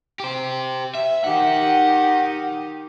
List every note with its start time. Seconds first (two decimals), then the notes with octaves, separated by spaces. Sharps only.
0.20 G4 C5
0.95 E5
1.24 D#3 D#4 G4 F#5